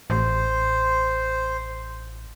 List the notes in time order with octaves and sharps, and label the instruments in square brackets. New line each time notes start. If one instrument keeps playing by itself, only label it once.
[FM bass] A1 [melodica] C5